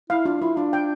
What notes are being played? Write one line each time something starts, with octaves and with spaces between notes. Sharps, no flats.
E4 F5
D4 F4
E4 F4
D4 F4
G5